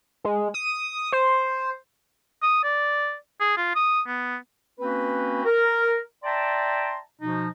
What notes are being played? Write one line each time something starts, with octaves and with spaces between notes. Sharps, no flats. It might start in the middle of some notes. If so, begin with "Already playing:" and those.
G#3
D#6
C5
D#6
D5
G#4
F4
D#6
B3
A#3 C4 C#4 F#4 B4
A#4
D5 E5 G5 A5 A#5 C6
B2 F3 D#4